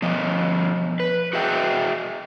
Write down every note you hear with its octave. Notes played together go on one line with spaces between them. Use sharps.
B2 F3 D#5
B4
F#4 G#4 D#5 E5 G5